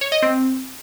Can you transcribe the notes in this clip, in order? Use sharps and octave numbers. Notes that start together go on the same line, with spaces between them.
C#5
D#5
C4